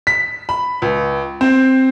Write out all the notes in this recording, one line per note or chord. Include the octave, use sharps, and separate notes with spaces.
B6
B5
C#2
C4